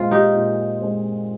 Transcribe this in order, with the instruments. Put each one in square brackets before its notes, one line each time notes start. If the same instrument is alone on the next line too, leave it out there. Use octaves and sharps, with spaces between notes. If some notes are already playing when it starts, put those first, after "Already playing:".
Already playing: [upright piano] A#2 G#3 C4 [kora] F4
[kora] D#4 G4
[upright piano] A#2
G#3 C4